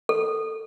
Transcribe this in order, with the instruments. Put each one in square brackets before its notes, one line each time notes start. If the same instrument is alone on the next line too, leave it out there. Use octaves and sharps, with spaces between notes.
[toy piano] A4